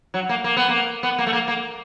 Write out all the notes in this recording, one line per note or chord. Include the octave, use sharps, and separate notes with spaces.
F#3
A#3
A#3
B3
A#3
B3
A#3
A3
A#3
A#3